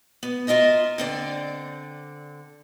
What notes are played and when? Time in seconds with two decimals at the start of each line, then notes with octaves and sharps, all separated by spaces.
0.23 B3
0.47 F4 A#4 D#5 E5
0.98 D3 C4 D5